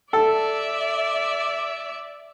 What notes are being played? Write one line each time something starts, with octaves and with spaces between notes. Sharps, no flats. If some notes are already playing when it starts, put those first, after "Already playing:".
A4 D5 E5